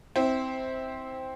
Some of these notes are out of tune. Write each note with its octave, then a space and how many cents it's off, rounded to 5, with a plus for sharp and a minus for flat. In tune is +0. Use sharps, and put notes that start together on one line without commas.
C4 +0 E4 -30